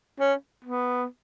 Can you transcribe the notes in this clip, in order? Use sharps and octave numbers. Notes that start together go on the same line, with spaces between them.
C#4
B3